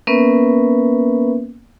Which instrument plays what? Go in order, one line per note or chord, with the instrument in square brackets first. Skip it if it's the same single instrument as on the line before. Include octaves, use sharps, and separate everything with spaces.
[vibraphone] A#3 B3 C#4 A#4 B4 E5